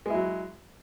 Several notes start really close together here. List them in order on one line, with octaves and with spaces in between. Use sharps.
G#3 E4 F#3